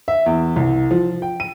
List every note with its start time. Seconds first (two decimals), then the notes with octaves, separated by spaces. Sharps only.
0.08 E5
0.26 E2
0.56 C2
0.91 F3
1.22 G5
1.40 D#7